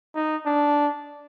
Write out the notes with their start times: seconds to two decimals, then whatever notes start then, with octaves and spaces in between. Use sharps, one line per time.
0.15 D#4
0.46 D4